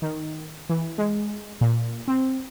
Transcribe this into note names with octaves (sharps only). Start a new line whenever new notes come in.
D#3
E3
G#3
A#2
C4